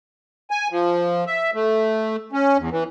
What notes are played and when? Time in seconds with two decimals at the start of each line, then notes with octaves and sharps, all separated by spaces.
0.51 G#5
0.70 F3
1.27 E5
1.54 A3
2.32 C#4
2.58 E2
2.71 E3